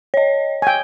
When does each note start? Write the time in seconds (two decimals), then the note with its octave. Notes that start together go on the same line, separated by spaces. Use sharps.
0.14 C#5 D#5
0.62 G5 G#5